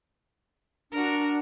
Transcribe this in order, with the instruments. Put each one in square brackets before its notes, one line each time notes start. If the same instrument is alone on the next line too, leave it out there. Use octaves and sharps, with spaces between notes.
[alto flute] D4 [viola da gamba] F#4 A#4